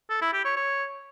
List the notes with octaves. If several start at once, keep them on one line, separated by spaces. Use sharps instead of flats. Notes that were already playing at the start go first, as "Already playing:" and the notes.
A4
E4
G4
C#5
C#5